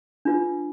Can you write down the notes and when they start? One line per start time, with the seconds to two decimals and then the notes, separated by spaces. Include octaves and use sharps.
0.25 D4 F4 B4